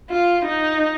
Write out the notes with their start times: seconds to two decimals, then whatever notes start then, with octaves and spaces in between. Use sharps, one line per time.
0.10 F4
0.46 D#4